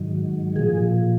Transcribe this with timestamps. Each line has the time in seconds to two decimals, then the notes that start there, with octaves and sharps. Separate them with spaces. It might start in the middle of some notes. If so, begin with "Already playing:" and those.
Already playing: G#2 D#3 F#3
0.56 A#2 F3 G#4